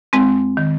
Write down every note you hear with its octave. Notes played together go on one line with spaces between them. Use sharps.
F2 G#3 C4
D#3